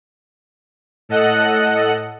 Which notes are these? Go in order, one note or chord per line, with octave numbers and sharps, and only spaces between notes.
A2 A4 D#5 F#5 F#6